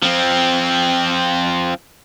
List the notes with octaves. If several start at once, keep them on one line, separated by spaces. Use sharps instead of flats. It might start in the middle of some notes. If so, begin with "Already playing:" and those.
F3 C4